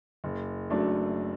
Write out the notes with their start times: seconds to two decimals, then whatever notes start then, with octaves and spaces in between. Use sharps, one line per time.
0.24 F#1
0.70 F#2 F#3 A3 D4